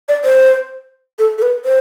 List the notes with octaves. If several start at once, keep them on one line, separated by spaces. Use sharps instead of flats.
D5
C5
A4
A4
B4
C5